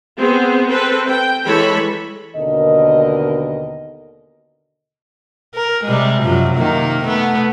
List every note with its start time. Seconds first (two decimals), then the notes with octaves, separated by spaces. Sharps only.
0.18 B3 C4 G#4
0.69 C4 A4 B4
1.07 G5
1.45 E3 G#3 A4 C#5 B5
2.36 D#2 B2 D3 A#4 D#5
5.54 A#4
5.84 C3 G3 G#3
6.23 F#2 C3 F3
6.54 C3 D#3 A#3
7.04 A3 B3